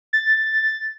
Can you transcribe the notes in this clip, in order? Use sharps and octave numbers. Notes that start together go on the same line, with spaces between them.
A6